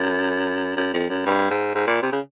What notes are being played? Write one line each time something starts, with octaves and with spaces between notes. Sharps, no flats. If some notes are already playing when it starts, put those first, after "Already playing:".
Already playing: F#2
F#2
F2
F#2
G2
G#2
G#2
A#2
C3
C#3